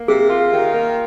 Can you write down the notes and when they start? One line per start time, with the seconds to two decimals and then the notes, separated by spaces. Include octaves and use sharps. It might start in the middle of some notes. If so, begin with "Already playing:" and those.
Already playing: A#3
0.08 C3 G#4
0.30 F4
0.52 D#3
0.73 A#3